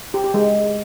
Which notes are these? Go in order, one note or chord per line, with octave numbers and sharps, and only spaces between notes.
G4
G4
G#3